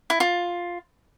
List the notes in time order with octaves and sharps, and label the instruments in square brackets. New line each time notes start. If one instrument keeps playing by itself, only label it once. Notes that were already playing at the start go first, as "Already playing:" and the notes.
[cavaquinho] E4
F4